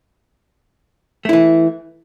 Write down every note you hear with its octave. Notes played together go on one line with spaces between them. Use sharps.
E3 A3 E4